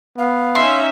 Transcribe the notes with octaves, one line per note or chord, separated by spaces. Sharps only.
B3 F5
C#4 D#4 E5 C6